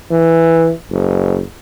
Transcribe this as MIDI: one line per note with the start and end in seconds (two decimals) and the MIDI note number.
0.11 0.72 52
0.91 1.42 30